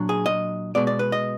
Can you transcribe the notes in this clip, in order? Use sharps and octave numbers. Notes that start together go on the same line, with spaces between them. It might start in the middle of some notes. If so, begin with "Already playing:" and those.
Already playing: A#2 F#3 D4
G#4
D#5
B2 G#3 B3 D5
D5
B4
D#5